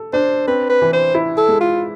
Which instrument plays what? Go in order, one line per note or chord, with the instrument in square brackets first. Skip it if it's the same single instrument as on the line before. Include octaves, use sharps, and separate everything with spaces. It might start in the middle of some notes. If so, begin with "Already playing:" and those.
Already playing: [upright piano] A4
[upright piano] D4 [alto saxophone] C5
[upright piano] C4 [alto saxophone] B4
[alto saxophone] B4
[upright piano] E3
[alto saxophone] C5
[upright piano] E4
[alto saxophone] A4
[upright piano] G#3
[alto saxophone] F4